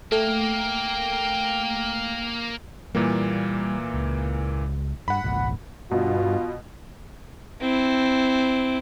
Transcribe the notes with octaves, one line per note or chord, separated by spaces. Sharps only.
A3 A#3 G5
A#2 E3 G3 A#3
C#2
G2 F#5 B5
G#1 C#2 A#2
G2 B2 F4 F#4
C4 E4